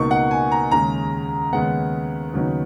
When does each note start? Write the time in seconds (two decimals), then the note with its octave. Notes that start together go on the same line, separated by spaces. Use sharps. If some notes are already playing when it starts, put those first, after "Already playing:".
Already playing: C#2 B2 A#3 D#4 C#6
0.11 F#5
0.31 G#5
0.52 A#5
0.71 D#2 C#3 G#3 A#5
1.52 D#2 C#3 G#3 B3 F#5
2.33 D#2 C#3 F#3 B3 D#4